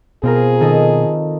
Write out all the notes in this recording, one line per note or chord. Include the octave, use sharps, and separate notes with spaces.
B2 C4 F4 G#4 A#4
D#3 A4 D#5